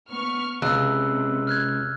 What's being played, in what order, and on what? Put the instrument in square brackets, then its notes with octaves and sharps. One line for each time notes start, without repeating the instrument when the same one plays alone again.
[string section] B3 C#6 F6
[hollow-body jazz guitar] C#2 [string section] C3 [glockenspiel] E6 F#6
[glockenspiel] F6 F#6 G#6